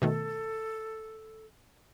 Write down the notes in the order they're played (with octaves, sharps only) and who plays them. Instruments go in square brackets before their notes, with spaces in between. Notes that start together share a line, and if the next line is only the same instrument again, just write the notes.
[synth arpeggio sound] B2 D#3 A3 [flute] A4